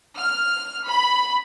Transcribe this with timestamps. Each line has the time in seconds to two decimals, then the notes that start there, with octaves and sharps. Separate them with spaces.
0.16 F6
0.87 B5